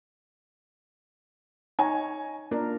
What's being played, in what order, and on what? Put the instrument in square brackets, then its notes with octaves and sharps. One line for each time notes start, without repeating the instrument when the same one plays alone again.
[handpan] D#4 C#5 [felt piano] G#5 A#5
[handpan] A#3 F4 A#4 [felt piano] D4